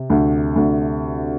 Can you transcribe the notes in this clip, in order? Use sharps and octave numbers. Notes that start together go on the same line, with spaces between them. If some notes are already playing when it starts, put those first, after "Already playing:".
Already playing: C3
D2
D2